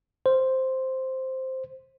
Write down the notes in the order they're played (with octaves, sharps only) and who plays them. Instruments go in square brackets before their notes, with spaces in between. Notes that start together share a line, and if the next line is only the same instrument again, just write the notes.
[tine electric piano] C5